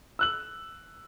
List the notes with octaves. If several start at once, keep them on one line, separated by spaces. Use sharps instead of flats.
E6 F#6 F#7